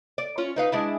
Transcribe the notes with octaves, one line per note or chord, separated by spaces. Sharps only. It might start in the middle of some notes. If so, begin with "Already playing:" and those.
D5
C#4 F4
D#4 B4 F5
G#3 D4 E4